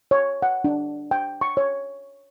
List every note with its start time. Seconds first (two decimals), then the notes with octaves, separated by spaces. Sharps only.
0.11 C#5
0.42 F#5
0.64 D4
1.11 G5
1.41 C#6
1.57 C#5